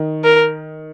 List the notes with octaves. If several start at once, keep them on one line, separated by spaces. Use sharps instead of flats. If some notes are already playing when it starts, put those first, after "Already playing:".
Already playing: D#3
A#4